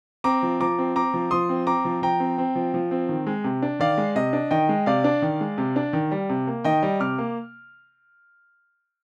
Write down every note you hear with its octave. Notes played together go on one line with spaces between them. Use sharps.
C4 A#5 D6
F3
F3 A#5 D6
C4
C4 A#5 D6
F3
F3 C6 D#6
C4
C4 A#5 D6
F3
F3 G5 A#5
C4
C4
F3
F3
C4
D#3
G#3
C3
D4
D#3 D5 F5
G#3
C3 D#5
D4
D#3 D#5 G5
G#3
C3 D5 F5
D4
D#3
G#3
C3
D4
D#3
G3
C3
A#3
D#3 D#5 G5
G3
C3 D6 F6
A#3